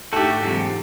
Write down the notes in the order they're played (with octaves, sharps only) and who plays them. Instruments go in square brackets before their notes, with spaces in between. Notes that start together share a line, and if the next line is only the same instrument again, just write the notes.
[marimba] G#2 D4 D#4 [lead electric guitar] A3 F#4 [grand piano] G4 A4
[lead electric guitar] G#2 C3 [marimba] E3 F#3 F4